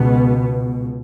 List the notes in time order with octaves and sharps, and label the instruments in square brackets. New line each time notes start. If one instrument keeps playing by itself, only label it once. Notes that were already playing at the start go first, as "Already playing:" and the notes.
Already playing: [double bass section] C#2 B2 B3